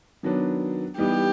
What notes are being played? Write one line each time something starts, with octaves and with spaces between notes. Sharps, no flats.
D#3 F#3 B3 D4
E3 G3 B3 D#4 G4